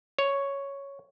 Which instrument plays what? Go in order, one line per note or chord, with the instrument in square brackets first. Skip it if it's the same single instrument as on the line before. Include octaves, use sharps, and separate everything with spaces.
[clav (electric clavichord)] C#5